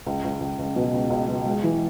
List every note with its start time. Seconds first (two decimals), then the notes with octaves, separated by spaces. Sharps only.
0.06 C#2
0.24 C#2
0.41 C#2
0.59 C#2
0.76 B2
0.94 C#2
1.10 C#2
1.28 B2
1.46 G#3
1.63 E3